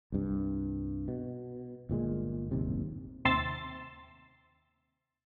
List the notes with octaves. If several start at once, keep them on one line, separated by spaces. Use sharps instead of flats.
C2 G2
B2
G1 A#2 D#3 G#3
D1 G1 D#2 C3
D#2 C3 C6 E6 A6